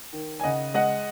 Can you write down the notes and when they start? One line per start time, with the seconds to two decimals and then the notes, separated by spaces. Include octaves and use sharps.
0.12 D#3
0.40 G#5
0.43 C#3 D#5 F#5
0.74 G#3 D#5 F#5